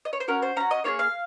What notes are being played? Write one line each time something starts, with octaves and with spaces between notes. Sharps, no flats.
D#5
C#5
C5
C#4 F#4 A#4
C5
C#4 F#4 A#5
D#5
A#3 F4 G#4 C#5
F5